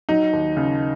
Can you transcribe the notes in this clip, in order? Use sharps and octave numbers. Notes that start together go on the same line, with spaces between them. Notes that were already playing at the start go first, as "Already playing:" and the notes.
F#3 D#4
D#2
C#3